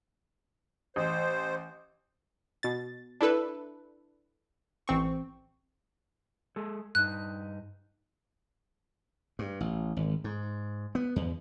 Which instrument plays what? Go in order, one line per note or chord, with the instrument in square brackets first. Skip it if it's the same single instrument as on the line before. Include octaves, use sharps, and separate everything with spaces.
[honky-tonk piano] A1 [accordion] C5
[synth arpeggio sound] B2 A6
D4 E4 A4 B4
A1 C4 C#6
[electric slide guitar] G#3 G#4 A4
[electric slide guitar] G2 D#4 [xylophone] F#6
[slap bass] G2
A1
G#1
G#2
B3
E2